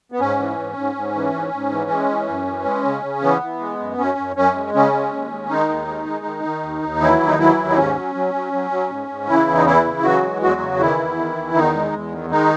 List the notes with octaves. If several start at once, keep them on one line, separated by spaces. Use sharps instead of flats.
B3
G#2 C#4
E3
G#2
G#2
G#2
E3
G#2
G#2
E3
G#3
E3
F#2
E3
G#3
C#3
C#3
E3 B3
E3
G#3
F#2
F#2 C#4
F#2
F#2 C#4
G#3
C#3 C#4
G#3
D#2
G#3
D#3 G#3 D#4
D#2
G#3
G#3
D#3
D#3
D#2
D#2
E3 F#3 E4
D#2
D#4
E3 F#3 E4
D#2
D#4
G#2 C#4
F#3
F#3
F#3
F#3
F#3
G#2
G#2
C#3 E3 E4
E2
D#4
E3 E4
C#3
E3 F#3 F#4
G#3
E2 F#3 F#4
C#3
D#3 E3 E4
E2
D#3
E2
E2 D#3 D#4
G#3
E2
D#3
D#3 G#3 D#4